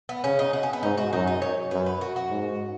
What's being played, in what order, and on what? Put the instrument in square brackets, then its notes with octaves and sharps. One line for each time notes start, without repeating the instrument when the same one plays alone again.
[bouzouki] B3
[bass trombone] C#3 [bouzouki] C#4
[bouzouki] D#4
F#4
C#4
B3
[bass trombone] G#2 [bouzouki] D#4
[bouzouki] F#4
[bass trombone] F#2 [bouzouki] D#4
[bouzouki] D#4
C#5
[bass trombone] F#2 [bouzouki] B4
[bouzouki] B4
F#4
F#4
[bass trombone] G#2